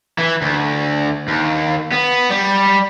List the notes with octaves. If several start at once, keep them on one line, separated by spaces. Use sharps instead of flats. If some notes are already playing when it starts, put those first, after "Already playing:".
E3
D2
D#2
B3
G3